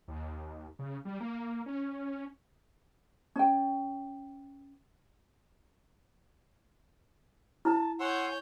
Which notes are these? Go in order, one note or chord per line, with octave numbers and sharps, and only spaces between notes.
D#2
C#3
G3
A#3
C#4
C#4 G5
E4 A5
C#5 F#5 G#5 C6 E6 G6